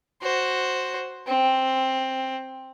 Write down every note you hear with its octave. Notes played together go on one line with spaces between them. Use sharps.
F#4 C5
C4